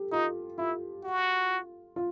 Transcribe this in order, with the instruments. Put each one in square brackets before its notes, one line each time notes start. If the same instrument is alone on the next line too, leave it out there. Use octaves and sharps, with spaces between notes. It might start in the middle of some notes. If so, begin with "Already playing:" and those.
Already playing: [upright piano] G4 A4
[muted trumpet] D#4 [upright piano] F4
[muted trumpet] E4 [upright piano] F4
[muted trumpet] F#4
[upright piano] F4